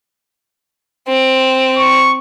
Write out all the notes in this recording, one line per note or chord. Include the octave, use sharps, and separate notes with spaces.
C4
C#6